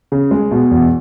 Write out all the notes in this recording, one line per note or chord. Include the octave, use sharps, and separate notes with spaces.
C#3
G#3
B2
E2